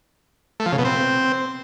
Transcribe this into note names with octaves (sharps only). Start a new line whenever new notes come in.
A3
F3
C#3
B2
C4